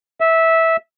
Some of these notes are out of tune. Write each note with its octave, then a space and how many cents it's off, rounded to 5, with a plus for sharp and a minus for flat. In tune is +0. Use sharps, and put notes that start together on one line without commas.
E5 -15